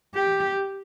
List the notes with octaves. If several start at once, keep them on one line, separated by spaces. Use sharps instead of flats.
G4